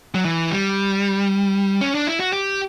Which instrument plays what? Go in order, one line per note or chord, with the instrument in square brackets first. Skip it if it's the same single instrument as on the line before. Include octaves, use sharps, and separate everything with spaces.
[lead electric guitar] F#3
E3
G3
C#4
D4
E4
F#4
G4